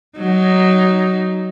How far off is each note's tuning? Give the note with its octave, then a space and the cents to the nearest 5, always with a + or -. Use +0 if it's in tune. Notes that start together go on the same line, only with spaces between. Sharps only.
F#3 +15 D#4 +0